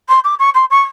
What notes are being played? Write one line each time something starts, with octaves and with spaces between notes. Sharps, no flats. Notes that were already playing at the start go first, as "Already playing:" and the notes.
C6
D6
C#6
C6
C#6